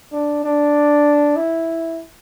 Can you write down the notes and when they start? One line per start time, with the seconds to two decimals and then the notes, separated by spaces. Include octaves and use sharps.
0.12 D4
0.44 D4
1.36 E4